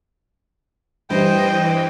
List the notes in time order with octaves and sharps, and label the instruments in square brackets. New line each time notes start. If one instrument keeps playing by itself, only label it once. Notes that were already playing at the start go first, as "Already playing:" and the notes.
[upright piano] G2 G3 [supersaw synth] E3 [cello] C5 D#5 [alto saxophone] G5